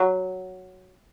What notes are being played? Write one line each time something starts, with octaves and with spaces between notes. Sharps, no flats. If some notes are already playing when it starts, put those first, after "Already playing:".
Already playing: F#3